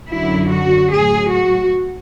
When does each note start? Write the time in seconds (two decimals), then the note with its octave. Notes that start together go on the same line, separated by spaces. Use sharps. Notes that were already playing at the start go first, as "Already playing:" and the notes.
0.13 F#2 D3 F#3 E4
0.52 F#4
0.92 A2 F#3 G#4
1.32 F#4